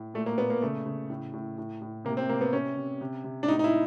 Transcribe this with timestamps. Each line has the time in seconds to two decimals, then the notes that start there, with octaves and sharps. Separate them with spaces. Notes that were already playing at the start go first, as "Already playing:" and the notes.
Already playing: A2
0.14 A#2 A3
0.26 A#3
0.38 A#2 B3
0.50 A#3
0.62 C#3 A3
0.86 C#3
1.10 A2
1.33 A2
1.58 A2
1.82 A2
2.05 C3 A#3
2.17 C4
2.29 C3 A#3
2.41 B3
2.53 C3 C#4
2.77 C3
3.01 C3
3.24 C3
3.43 D4
3.48 A2 D#4
3.59 D#4
3.64 E4